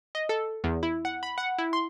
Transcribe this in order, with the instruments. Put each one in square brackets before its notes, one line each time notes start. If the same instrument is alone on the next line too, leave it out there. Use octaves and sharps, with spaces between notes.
[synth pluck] D#5
A4
E2
E4
F#5
B5
F#5
E4
C6